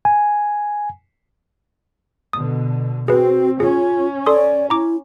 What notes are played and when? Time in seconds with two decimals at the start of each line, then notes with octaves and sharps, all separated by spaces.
0.05 G#5
2.33 B2 D3 D#6
3.08 C4 F#4 G#4 B4
3.60 C#4 F4 G#4
4.26 A4 D5 C6 D#6
4.70 E4 A#5 D6